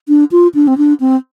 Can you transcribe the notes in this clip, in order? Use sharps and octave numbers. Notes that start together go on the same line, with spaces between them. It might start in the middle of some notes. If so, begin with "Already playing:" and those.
D4
F4
D4
C4
D4
C4